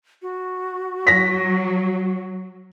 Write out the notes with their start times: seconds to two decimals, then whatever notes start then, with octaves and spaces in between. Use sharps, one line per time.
0.22 F#4
1.07 F#3 A#6 B6